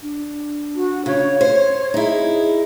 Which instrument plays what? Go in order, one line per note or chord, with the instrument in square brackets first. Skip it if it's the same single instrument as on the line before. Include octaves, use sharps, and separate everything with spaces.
[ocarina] D4
[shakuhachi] F#4
[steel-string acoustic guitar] C#3 [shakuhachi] C#5
[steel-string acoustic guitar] C5
[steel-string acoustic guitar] D#4 E4 [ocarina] G#4